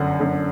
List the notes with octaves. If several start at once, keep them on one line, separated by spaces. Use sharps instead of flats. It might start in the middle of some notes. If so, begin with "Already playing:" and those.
Already playing: G1 F#2 D3 F#5
G1 F#2 D3